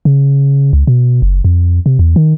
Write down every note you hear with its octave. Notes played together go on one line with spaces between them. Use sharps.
C#3
C#2
B2
F#1
F2
C3
E2
D#3